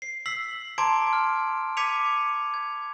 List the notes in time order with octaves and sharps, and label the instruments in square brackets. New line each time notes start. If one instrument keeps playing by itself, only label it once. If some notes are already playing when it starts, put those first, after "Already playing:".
[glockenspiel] C7
E6 B6 C7 F#7
A5 A#5 C6 D6 G#6 D7
F6
D6 G#6 B6 C#7 D#7 F7
G#6